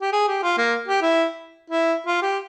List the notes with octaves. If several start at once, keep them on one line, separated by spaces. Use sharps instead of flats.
G4
G#4
G4
F4
A#3
G4
E4
E4
F4
G4